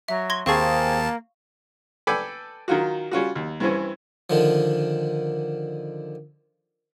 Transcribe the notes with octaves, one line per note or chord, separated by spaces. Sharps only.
F#3 E5
C6 G#6 A#6 G7
D#2 A#3 C4 G#4 F5 A5 C#6
A4 B4 D5 G5 G#5 B5
D#3 F#3 F4 F#4
G3 C#4 F4 F#4
D#2
G2 E3 C4 C#4
D3 D#3 F3